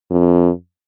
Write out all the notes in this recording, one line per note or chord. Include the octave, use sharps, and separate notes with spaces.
F2